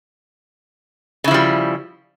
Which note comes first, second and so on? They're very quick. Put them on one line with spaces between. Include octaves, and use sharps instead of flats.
C#3 E4 F3 G3